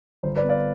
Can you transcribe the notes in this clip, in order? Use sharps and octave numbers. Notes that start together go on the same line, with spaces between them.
G1 C5
B4 D5
B3
D5 F5